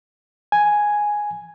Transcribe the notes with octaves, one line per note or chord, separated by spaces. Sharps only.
G#5